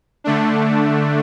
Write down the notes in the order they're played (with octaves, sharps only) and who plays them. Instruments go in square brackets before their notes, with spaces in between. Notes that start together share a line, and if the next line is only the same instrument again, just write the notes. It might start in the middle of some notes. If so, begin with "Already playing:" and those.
[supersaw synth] D3 A3 D4